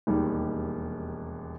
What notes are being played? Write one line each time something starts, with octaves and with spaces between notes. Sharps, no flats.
E1 D#2 D#3 G3